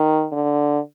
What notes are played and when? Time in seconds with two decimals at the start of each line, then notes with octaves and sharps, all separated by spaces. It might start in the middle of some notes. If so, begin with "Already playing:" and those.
Already playing: D#3
0.32 D3